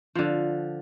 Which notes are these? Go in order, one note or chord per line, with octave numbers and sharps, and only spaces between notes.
D3 F3